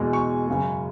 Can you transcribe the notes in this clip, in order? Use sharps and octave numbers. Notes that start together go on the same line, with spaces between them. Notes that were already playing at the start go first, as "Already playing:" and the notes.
Already playing: E2 B2 G#3
C#6
F#2 C#3 G#3